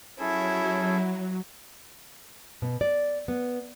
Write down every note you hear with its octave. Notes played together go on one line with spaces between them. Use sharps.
F#3 C#4 E4 G#4 A4
B2
D5
B3